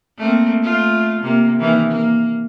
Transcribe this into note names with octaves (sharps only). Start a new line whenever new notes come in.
A3 A#3 C4
A3 F4
C3 A#3
D#3 E3 A#3
A#3